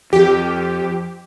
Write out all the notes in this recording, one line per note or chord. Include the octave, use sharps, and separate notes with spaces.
F2 G4